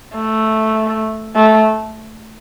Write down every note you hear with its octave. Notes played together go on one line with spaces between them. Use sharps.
A3
A3